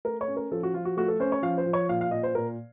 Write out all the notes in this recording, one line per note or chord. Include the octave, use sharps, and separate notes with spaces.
A3 A#4
C#5
C#4
A#4
F3 A4
F#4
F3 F4
F#4
A3 F#4
A4
C#4 C5
C#5
F3 F5
C5
F3
C#5
A#2 F5
F5
A#2 D#5
C5
A#2 A#4